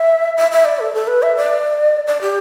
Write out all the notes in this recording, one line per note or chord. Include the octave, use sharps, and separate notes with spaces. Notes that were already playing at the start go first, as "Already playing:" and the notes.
Already playing: E5
E5
E5
D5
A4
A4
B4
E5
D5
D5
G4